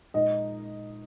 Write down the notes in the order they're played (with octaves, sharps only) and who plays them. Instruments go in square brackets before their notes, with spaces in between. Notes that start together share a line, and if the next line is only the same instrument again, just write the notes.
[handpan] A#2 G#3 D#4 A#4 [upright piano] D#5